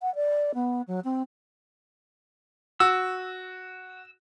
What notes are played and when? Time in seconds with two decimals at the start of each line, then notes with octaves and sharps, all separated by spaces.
0.01 F#5
0.15 D5
0.54 B3
0.87 F#3
1.04 C4
2.80 F#4 E6